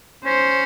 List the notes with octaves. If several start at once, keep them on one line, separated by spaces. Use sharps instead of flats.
C#4 C5